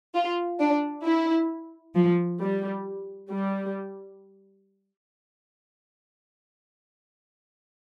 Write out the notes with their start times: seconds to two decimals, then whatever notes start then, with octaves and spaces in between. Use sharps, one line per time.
0.15 F4
0.60 D4
1.04 E4
1.95 F3
2.40 G3
3.30 G3